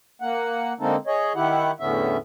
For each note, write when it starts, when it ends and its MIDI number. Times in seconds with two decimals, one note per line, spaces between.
0.21 0.73 58
0.21 0.73 78
0.80 0.96 50
0.80 0.96 56
0.80 0.96 58
0.80 0.96 60
0.80 0.96 63
0.80 0.96 69
1.07 1.33 68
1.07 1.33 73
1.07 1.33 75
1.35 1.71 51
1.35 1.71 64
1.35 1.71 67
1.35 1.71 78
1.80 2.17 40
1.80 2.17 45
1.80 2.17 50
1.80 2.17 59
1.80 2.17 61
1.80 2.17 76